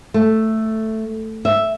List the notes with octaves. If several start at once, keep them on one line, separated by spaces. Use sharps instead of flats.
A3
E5